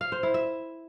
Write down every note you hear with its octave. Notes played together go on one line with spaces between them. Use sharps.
F5
C5
E4
E5